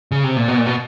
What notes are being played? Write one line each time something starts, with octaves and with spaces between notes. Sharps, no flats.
C#3
C3
A#2
B2
A#2
B2